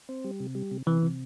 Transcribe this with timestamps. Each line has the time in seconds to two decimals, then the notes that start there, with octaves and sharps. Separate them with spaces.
0.09 C4
0.24 G3
0.40 C3
0.55 G3
0.71 C3
0.86 C3 E3
1.03 C3